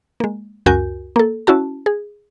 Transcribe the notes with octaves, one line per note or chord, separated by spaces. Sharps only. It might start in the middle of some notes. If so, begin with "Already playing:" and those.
G#3 A#3
C#2 F#2 F#4 A#4 G#5 G6
A#3 A4
C#4 E4 F#4 A5
G#4